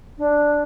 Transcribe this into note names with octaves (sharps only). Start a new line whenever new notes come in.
D4